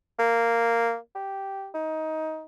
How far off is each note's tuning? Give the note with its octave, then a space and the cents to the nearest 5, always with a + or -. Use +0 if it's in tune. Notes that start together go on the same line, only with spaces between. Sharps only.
A#3 -10
G4 -5
D#4 +20